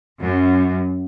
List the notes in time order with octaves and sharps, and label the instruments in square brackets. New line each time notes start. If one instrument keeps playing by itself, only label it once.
[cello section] F#2